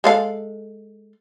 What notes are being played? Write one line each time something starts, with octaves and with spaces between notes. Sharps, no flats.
G#3 A4 F5